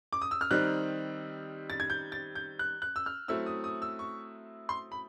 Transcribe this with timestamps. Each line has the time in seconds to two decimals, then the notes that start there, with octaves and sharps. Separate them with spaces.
0.13 D6
0.22 D#6
0.31 E6
0.41 F6
0.51 D#3 G3 C4 D#4 F#6
1.70 A6
1.80 G#6
1.90 G6
2.12 A6
2.35 G6
2.59 F#6
2.82 F#6
2.96 E6
3.06 F6
3.28 F#3 A3 C4 E4 E6
3.46 D#6
3.64 D#6
3.82 E6
3.99 C#6
4.69 C6
4.92 B5